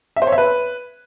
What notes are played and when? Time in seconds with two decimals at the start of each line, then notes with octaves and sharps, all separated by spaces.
0.16 E5
0.22 C5
0.27 C#5
0.32 E5
0.38 B4